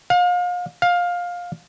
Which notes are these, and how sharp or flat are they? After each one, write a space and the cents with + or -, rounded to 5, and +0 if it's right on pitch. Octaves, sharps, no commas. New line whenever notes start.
F5 +35
F5 +15